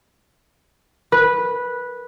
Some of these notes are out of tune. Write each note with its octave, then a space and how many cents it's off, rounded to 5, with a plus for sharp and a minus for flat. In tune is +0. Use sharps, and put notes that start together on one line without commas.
B4 -10